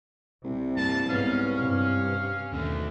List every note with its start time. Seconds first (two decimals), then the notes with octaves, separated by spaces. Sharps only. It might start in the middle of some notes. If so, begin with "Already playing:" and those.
0.44 C2 C3
0.77 G2 A#3 A5
1.09 G#2 B3 C#4 F5
1.55 G2 C3 F5
2.53 D#2 B2 D3 A3